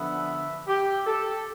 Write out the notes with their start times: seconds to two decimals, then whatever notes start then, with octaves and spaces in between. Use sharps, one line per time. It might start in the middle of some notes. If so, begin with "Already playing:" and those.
Already playing: D3 F3 B3 D4 E5
0.68 G4
1.07 A4